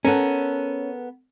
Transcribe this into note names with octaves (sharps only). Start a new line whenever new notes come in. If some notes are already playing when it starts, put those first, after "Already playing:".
B3 C#4 A4 A#4